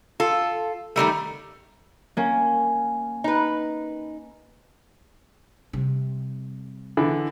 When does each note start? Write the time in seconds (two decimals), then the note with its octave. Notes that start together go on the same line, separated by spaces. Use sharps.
0.20 F4 A4
0.96 D#3 E3 G3 A3
2.17 A#3 C#4
3.24 D#4 B4
5.73 C3 G3
6.97 D3 E3